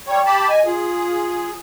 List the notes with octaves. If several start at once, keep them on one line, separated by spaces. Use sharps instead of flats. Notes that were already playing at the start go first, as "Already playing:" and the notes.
G3 C#5 G5
G4 A5 B5
D#5 G#5
F4 G#4